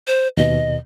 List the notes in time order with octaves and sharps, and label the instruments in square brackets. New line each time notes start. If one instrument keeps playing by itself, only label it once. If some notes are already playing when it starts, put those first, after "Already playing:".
[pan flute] C5
[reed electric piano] D#2 B2 [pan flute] D#5